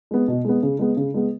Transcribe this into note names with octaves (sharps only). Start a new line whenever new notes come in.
G#3 B3
B2
G#3 B3
C#3
G#3 B3
C#3
G#3 B3